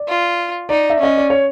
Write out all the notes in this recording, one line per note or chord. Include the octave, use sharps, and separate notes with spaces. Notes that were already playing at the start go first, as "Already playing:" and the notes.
Already playing: D5
F4
D#4 D5
E5
C#4 D#5
D5
C#5